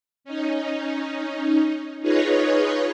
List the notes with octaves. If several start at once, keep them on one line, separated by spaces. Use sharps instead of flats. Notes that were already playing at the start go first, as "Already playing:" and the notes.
C#4 D#4
D#4 F4 G#4 B4 C#5 D#5